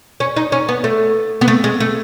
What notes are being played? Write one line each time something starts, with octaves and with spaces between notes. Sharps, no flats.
C#4
D#4
C#4
B3
A3
B3
A3
G#3
A3